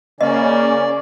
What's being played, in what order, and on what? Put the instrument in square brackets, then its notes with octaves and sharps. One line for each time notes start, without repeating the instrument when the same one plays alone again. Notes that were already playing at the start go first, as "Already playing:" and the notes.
[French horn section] C#3 A#3 [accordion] C#4 [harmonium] D5 [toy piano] D#5